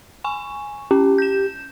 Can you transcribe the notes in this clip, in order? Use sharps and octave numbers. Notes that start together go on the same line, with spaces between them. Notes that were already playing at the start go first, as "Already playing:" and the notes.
G#5 C#6
C#4 G4
G6 E7